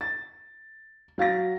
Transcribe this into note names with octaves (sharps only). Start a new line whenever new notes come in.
A6
F#3 F5 A6 A#6